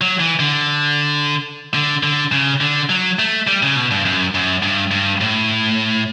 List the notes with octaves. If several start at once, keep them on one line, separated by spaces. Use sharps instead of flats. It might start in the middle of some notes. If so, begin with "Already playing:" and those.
F#3
E3
D3
D3
D3
C#3
D3
F#3
A3
G3
C#3
B2
G2
F#2
F#2
G2
G2
A2